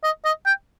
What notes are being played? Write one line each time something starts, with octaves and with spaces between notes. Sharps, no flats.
D#5
D#5
G5